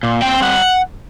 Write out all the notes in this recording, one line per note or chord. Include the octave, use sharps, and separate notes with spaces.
A#2
C4 G5
G3 F#5